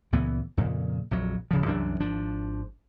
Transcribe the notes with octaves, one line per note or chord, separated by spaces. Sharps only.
C#2 A#2 E3 B3
F2 A#2 C#3
A#1 F2 F#3
D1 C#3 F3
C2 F#2 E3 D4
G#1 F3 D4